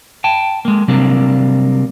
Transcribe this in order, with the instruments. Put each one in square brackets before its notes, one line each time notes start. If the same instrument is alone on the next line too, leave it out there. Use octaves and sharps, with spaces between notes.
[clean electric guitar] G5 A5
G#3 A#3
C3 F#3 G3 A#3 C4 D4